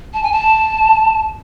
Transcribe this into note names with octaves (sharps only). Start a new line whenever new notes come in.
A5
G#5
A5